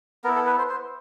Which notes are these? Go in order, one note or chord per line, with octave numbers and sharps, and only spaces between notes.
B3 E4 A#4
A4
B4
C5
C5